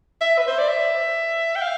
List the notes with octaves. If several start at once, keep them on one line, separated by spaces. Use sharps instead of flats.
E5
B4
C5
D5
E5
G5
F5